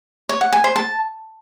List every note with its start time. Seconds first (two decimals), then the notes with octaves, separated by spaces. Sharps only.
0.29 C#5
0.41 F#5
0.53 G#5
0.64 C5
0.76 A5